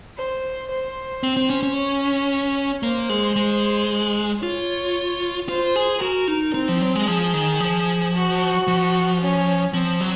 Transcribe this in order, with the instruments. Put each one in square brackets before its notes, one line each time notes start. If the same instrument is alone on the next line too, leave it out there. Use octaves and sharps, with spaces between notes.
[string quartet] C5
C5
[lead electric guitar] C4
C4
C#4
C#4
[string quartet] C#5
[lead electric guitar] A#3 [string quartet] C5
[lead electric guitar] G#3
G#3
[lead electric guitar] F4 [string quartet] C#5
[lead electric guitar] F4 [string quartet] C5
[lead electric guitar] G#4
[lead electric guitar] F#4 [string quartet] A#4
[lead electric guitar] D#4
[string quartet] C4 [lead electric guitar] D#4
[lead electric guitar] F3
F#3
G#3
[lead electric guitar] F3 [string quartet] G#4
[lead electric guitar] D#3
F3
[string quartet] F#4
[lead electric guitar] F3
[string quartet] C#4
[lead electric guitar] F3 [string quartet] C4
[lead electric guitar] F#3